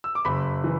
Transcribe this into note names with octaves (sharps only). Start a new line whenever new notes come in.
E6
D6
F#1 B5
E3